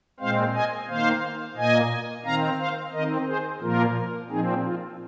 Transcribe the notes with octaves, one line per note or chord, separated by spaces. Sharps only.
A#2 G#3 C4 C5 F5
D#5 G#5
D#3 A#3 C5 F5
A#2 A#3 D#5 G#5
D#3 C4 F5 A#5
C5 F5
D#3 C4 A#4 D#5
G#4 C5
A#2 F3 A#3 F4 A#4
A#2 F3 C4 D#4 G#4
F4